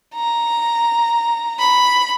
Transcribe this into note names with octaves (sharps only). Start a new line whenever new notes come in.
A#5
B5